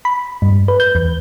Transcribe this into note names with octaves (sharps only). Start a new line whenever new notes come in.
B5
G2
B4
G6
E2